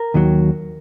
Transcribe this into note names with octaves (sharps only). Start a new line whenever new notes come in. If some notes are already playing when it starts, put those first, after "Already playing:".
Already playing: A#4
D#2 D#3 F#3